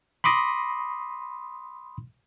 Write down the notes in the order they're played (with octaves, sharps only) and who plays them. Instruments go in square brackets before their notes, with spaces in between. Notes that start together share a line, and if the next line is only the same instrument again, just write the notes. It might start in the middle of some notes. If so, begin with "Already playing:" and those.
[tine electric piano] B5 C6 D6 D#6 A#6